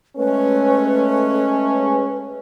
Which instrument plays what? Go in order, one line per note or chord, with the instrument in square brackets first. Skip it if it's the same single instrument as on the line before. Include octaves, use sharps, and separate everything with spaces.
[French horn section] G#3 A3 C#4 [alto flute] B4